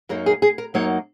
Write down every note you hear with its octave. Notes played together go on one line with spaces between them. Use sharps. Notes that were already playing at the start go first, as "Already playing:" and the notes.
F#2 F#3 A#3 D#4 A#4
G#4
G#4
A#4
F#2 F#3 A#3 D#4 C#5